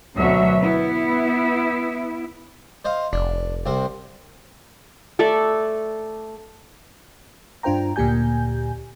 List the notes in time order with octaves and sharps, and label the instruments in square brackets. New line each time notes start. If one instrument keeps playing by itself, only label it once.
[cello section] D2 B2 F#3 F#4 E5
B3 E4
[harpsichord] C5 D#5 F5
[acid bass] F1 [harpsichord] D4
[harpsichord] C2 C3 C5
[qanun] A3 A4 D5 E5
[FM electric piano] G2 D4 F4 C5 G5 A#5
D2 A#2 A#3 G4 G#5 G6